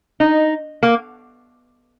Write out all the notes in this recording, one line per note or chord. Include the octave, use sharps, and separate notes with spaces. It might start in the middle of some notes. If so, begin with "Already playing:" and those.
D#4
A#3